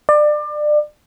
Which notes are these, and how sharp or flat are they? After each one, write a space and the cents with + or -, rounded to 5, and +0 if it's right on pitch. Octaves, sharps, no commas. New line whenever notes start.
D5 +30